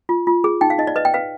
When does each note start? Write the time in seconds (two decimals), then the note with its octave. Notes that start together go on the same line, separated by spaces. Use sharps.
0.09 F4
0.27 F4
0.44 G#4
0.61 D#4 G5
0.70 F5
0.78 D#4 D#5
0.87 D5
0.96 B4 D#5
1.05 G5
1.14 B4 F5